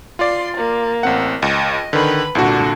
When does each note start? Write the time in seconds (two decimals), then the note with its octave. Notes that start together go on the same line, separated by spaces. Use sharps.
0.19 F4 D5 C6
0.56 A#3
1.03 A1 C4 F#5
1.42 C#2 D#5
1.93 D3 D#3 B4 B5
2.35 C2 A#2 D3 F#4